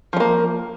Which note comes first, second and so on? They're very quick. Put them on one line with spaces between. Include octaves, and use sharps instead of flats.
F3 G3 A#3